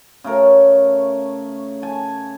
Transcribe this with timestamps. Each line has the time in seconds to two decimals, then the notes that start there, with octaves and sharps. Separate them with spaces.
0.24 C#3 A3 A#4 C#5
1.82 G#5 A5